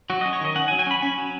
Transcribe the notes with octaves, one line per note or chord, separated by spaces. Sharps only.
F#3 F#4
C#4 D#5
C#5
D#3 D#5
C#4 F#5
G#5
F#3
G#5
C#4 B5
C#4 G#5
F#3